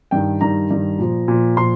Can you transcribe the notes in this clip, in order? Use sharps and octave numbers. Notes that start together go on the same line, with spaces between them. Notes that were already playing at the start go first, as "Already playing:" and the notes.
G2 D#3 G5
G2 D#3 A#5
G2 D#3
A#2 F3
A#2 F3
A#2 F3 C6